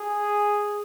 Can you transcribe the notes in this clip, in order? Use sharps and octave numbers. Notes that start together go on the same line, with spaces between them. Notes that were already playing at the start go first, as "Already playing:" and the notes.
Already playing: G#4